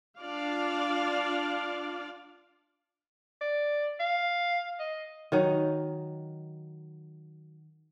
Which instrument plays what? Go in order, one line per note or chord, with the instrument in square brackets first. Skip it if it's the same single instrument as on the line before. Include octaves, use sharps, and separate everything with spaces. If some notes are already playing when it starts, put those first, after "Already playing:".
[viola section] D4 F4 D5 F5
[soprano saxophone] D5
F5
D#5
[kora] D#3 F#3 D#4